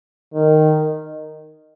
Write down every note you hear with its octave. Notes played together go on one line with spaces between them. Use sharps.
D#3